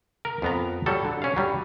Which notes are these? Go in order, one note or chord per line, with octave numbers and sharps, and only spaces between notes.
A#4
F2 B3 A#5
F#3 G3 A4
D3
C#4 F5
F#3 G3